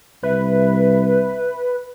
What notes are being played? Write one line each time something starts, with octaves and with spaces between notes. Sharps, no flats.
C2 B4 E5